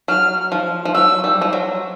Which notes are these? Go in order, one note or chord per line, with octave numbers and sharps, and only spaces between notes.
F#3 F6
F3
F3
F#3 E6
G3
F3
F#3